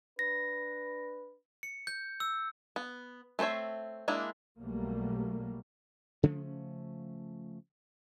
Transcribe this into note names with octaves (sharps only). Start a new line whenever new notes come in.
D4 B4 A#6
C#7
G6
E6
B3
A3 C4 C5 C#5 E5
G#3 A#3 D4 E4
B1 B2 F#3 G3 A3 A#3
C#3 F3 A3 C#4